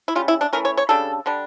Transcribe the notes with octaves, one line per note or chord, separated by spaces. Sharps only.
E4
C#3 G3 C#4 F4
E4
D4
E3 A3 C#4 A#4
C#5
C#5
C#3 G3 D4 A4
D3 G3 D4